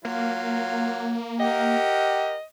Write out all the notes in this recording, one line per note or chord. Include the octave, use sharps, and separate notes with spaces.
F#3 A#3 F4
G4 A#4 D#5 F#5